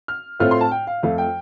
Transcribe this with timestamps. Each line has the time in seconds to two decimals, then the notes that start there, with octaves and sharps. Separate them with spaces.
0.08 F6
0.40 A2 A3 C4 F4 F6
0.51 C6
0.61 A5
0.71 G5
0.87 F5
1.03 F2 F3 A3 F5
1.18 G5